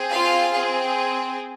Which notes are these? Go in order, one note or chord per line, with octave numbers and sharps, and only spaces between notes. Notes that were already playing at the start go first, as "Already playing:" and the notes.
Already playing: C4 G#4
F4 F5
C4 G#4